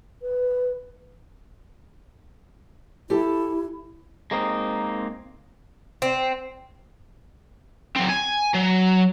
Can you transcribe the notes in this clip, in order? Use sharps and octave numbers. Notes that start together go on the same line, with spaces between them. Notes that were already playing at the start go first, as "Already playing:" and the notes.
B4
E4 G4 A4 A5
G#3 A#3 C4 D#4
C4
F#3 C4
G#5
F#3